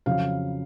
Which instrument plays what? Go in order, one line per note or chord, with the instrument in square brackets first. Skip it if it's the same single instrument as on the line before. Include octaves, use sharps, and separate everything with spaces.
[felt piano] F2 C#3 F#3 F5